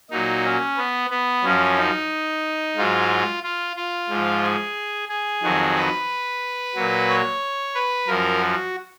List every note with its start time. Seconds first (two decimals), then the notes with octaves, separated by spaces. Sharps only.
0.11 A#2 F#3 D#4
0.44 C#4
0.77 B3
1.10 B3
1.44 F#2 F3 C#4
1.77 D#4
2.76 G#2 F#3 F4
3.43 F4
3.76 F4
4.09 G#2 F3
4.43 G#4
5.09 G#4
5.42 F2 D#3 F#3
5.76 B4
6.75 A#2 F#3
7.09 C#5
7.75 B4
8.07 F#2 F3 A#4
8.41 F#4